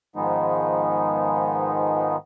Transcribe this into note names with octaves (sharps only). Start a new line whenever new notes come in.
G#2 D#3 F3 G#3 B3 D#4